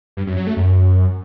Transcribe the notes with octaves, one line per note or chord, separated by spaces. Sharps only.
G2
F#2
F#3
A3
F#2